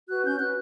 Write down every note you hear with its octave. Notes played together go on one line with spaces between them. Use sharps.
F#4 B4 F#6
C#4 G6
F#4 B4 F#6